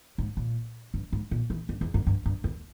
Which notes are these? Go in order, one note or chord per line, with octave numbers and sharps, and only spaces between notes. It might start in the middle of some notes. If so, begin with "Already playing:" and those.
G#2
A#2
G2
G#2
A#2
E3
G2
E2
G2
G2
G2
E2